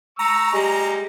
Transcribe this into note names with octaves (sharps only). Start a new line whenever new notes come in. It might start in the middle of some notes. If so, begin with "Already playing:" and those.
A#5 C#6 E6
G3 G#3